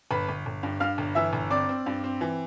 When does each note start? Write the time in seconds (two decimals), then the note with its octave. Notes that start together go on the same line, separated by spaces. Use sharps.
0.10 G1 B4 B5
0.28 G1
0.46 G1
0.63 G2
0.80 G2 F5 F6
0.98 G1
1.15 E3 E5 E6
1.33 G1
1.50 C4 D5 D6
1.69 C4
1.86 G2
2.04 C4
2.21 E3